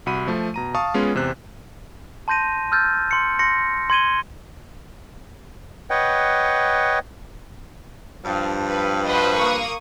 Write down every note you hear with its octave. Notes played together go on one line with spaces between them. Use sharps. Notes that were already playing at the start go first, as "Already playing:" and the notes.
C2 F#4 B5 D#7
F3 A3
B2 A#5 D#7
F5 A5 C#6 D#6
G#3 B3 C#4 F4 G#4
E2 C3 C5 F#6
A5 C6 G6 A#6 D#7
E6 F6 G6 A6
C6 C#7
C6 A#6 C#7
C6 G#6 D#7 G7
B4 C#5 D#5 F#5 G5
G2 F3
B4
F#4 B4 C5 D#5
A#3 C#6 D#6